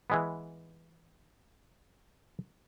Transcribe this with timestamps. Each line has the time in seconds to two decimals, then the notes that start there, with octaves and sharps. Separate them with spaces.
0.10 E3 G#3 B3